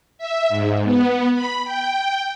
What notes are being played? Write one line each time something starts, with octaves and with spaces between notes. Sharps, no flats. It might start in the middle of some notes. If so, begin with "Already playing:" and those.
E5
G#2
B3
B5
G5